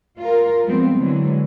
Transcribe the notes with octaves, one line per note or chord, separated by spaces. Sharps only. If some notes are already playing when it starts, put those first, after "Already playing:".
F4 A#4
F3 G3 G#3 B3 C4
D3 E3 F#3 G#3